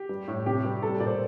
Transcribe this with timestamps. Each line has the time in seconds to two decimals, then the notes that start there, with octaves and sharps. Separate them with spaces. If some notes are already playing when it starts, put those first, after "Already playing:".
Already playing: G4
0.09 G3
0.28 A2
0.46 C3 G4
0.65 G3
0.82 G3 A4
1.00 A#2 D5
1.07 C5